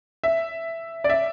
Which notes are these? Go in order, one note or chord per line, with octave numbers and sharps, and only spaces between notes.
E5
D5
E5